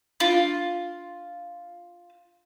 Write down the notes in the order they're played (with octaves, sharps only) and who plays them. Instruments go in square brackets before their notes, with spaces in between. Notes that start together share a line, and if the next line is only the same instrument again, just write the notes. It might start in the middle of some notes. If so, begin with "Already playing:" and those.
[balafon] D4 F5 [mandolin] F4